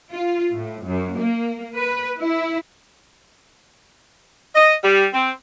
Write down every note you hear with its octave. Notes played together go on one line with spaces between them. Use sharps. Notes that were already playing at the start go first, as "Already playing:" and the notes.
F4
A2
F#2
A#3
B4
E4
D#5
G3
C4